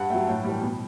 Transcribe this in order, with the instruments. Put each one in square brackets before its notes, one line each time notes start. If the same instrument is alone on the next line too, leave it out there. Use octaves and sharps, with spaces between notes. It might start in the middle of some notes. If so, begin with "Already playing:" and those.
Already playing: [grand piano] G2 F#5
F#3 A3 G5
A2 G5
E3 G3
B2